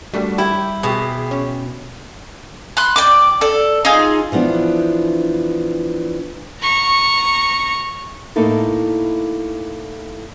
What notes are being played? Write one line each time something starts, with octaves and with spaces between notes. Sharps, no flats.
G3 A3 D4 F#4
E4 G4
B2 G4 G#4
C#4
B5 C6 F#6
D5 G5 D6
A4 D5
D#4 F4 G#4
E3 F3 B3 D4
A#5 C#6
A2 A#3 D#4 E4 A4